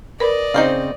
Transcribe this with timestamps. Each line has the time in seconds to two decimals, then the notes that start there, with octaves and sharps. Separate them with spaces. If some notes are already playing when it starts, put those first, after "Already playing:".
0.20 A#4 B4 D5 D#5 B5
0.54 C#3 C4 D#4 C5 F5